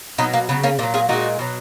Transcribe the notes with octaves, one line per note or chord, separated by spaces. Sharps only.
B2 F#3 B3 D#4
A#3
C#3 F#3 B3
A#3 C#4
A#2 F#3 A#3
F4 G#4
A#2 G#3 D#4 F#4
B2 F#3